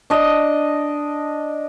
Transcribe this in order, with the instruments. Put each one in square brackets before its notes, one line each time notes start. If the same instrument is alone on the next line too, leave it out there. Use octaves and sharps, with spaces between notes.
[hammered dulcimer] D4 D#5